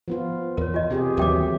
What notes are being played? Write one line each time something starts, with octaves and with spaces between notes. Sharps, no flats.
F3 B3 F4
E2 A#4 C#5
F4 D#5
C3 C4 G4 G#4
D#2 E3 F#3 G3 A#4 E5 G5 D6